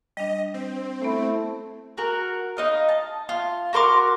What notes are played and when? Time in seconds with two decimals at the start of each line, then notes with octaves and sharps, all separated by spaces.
0.17 G3 D4 D#5
0.54 C4
1.02 A3 B3 E4 C5
1.97 F#4 A#4
2.57 D#4 D#5 F5
2.89 A5
3.29 F4
3.73 F#4 A#4 C6 D6